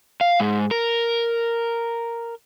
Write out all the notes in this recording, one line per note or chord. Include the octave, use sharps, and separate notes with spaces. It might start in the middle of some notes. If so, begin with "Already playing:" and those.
F5
G#2
A#4